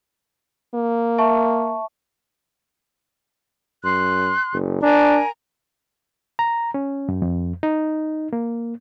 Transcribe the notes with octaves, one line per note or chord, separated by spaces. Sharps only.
A#3
E5 A5 C#6
F#2 C6 F#6
F#1
D4 A#4 G#5 A#5
A#5
C#4
F#2
F2
D#4
A#3